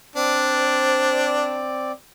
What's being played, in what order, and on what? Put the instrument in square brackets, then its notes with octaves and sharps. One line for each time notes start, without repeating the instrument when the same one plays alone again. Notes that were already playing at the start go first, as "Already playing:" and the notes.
[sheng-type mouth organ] C4 D5 [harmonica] D4 [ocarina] C5